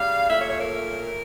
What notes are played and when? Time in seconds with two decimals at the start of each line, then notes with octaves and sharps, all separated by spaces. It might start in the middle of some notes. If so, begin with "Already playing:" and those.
Already playing: C#3 G3 F5
0.29 A#2 A3 E5
0.39 C#5
0.50 C#5
0.59 A#4